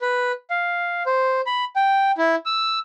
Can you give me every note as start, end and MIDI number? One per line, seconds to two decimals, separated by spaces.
0.01 0.32 71
0.50 1.03 77
1.06 1.41 72
1.46 1.65 83
1.76 2.12 79
2.18 2.35 64
2.46 2.79 88